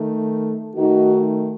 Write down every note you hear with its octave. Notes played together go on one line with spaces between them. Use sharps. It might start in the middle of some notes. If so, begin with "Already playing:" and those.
Already playing: D#3 A3
D#3 A3 D#4 F#4